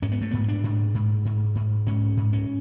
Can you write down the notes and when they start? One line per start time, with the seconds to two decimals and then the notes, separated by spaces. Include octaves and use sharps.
0.02 G#2 C#4
0.12 B3
0.21 A3
0.31 G#2 B3
0.48 D4
0.64 G#2
0.94 G#2
1.25 G#2
1.55 G#2
1.86 G#2 C#4
2.17 G#2
2.33 C#4